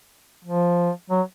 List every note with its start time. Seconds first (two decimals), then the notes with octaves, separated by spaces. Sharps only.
0.45 F3
1.10 F#3